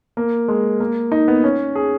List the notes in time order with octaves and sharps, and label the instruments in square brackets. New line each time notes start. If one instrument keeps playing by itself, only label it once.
[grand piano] A#3
G#3
A#3
D#4
B3
C#4
G#4